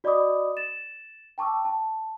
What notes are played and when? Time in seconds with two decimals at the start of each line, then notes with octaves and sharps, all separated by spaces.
0.04 F#4 D5 D#5 B5 D6 D#6
0.57 A6 E7
1.38 G5 A5 C#6 D6 E6
1.65 A5